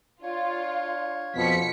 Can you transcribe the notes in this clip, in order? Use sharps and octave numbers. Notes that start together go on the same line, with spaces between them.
D4 F4 C#5 F5
F2 B2 F3 B6 C#7